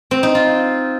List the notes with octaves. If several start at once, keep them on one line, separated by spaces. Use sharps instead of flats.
C4
D#4
F4